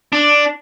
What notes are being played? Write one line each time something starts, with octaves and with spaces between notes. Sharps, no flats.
D4